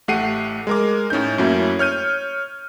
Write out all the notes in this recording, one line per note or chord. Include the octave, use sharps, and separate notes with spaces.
A1 A3 G4 F#5 C7 D#7
G#3 A#4 D6
A2 C#4 D#4 G6
F#2 A3 A#3 C#4 E4 F#4
C#5 F6 G6 D#7